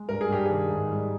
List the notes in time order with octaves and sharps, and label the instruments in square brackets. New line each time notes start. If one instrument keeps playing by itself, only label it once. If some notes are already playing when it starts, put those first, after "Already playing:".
Already playing: [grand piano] G#3
G2 A#4
G#4
G2 G4
D#3 G#4
G#2
G3